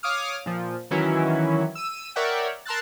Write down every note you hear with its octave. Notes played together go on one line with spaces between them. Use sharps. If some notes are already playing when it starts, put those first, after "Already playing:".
C#5 F5 D6 D#6 F6
A#2 F3
D#3 E3 F#3 C#4 E4
E6 D#7
A#4 C#5 D5 E5 F#5 G5
A#4 A5 C6 E6 F#6 A6